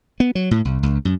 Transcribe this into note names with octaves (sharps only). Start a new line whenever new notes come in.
B3
F#3
A2
C2
C#2
F#2